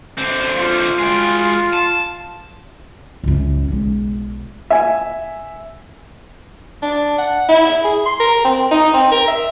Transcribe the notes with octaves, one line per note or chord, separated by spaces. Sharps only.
D3 C4
F4
G#3 G5
A5
C#2 F#2
B1 G#3
E5 G#5
D4
F#5
E4
G#4
C6
A#4
C4
D#4
C4
A#4
E5